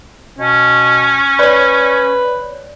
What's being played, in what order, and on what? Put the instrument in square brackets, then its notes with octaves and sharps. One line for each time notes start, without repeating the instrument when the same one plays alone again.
[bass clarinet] B2 [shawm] C#4
[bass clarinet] B4 [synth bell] C#5 D5